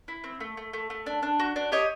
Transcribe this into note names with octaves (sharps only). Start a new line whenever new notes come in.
E4
C4
A3
A3
A3
A3
D4
D4
F#4
D4
G4 C#5 D#5